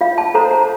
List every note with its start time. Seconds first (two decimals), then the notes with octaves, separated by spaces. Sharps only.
0.01 F4 F5
0.18 A5
0.35 A4 C5 A#5
0.51 A#5